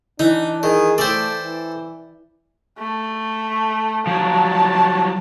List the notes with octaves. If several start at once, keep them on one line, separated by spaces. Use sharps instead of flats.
E3 D4 D#4
D#3 G#4
A3 A4 C5 D5 E5 G5
E3
A3
F3 F#3 A5